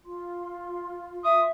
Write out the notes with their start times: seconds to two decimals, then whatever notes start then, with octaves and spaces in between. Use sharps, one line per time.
0.06 F4 C6
1.24 E5 D#6